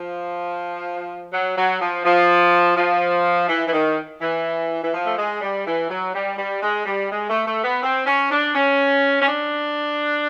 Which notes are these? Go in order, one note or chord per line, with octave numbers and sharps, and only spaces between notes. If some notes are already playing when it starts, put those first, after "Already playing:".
Already playing: F3
F#3
F#3
F3
F3
F3
E3
E3
D#3
E3
E3
F3
A3
G#3
G3
E3
F#3
G3
G3
G#3
G3
G#3
A3
A3
B3
C4
C#4
D4
C#4
C#4
D4